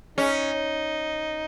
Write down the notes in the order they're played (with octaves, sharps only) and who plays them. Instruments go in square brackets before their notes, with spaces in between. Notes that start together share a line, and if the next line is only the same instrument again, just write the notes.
[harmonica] G#3 D#4 [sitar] C#4